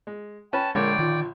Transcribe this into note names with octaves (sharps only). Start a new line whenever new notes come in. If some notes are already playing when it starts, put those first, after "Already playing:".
G#3
C#4 B4 G5 A5
A#1 D3 G#3 A#4 C#5 D5 G5
D#3 F4